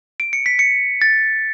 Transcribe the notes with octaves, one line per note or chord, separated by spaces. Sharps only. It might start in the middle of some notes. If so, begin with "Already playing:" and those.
D7
C#7
B6
C#7
A6